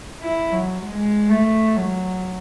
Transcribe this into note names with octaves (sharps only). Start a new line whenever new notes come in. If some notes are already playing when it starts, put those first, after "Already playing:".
E4
F#3
G#3
A3
F#3